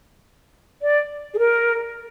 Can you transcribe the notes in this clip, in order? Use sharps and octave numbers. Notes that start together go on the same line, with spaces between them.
D5
G#4
A#4